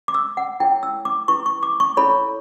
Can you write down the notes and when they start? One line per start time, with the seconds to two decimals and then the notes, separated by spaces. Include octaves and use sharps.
0.08 D6
0.14 E6
0.37 F#5
0.60 E4 A4 C#5 G5
0.83 E6
1.05 D6
1.28 E4 B4 C#6
1.46 C#6
1.63 D6
1.80 C#6
1.97 E4 A4 C#5 B5